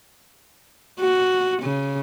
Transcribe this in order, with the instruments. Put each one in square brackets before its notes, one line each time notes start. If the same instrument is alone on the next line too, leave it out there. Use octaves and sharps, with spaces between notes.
[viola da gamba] F#4
C#3